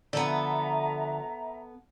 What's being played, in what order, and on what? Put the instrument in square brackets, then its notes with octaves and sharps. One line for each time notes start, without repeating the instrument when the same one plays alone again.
[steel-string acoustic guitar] D3 F3 [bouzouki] B3 A4 [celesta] D5 [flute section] E5 A#5